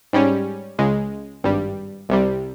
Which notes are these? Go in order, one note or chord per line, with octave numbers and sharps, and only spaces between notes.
G#2 G3 C#4
C#2 C#3 G#3
G#1 G2 G3
C2 C3 G3